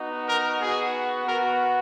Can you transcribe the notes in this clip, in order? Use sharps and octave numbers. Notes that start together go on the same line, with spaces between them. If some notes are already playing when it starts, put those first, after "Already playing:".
Already playing: B3 D#4 F#4
A#4
B3 F#4 G#4
B3 F#4 A#4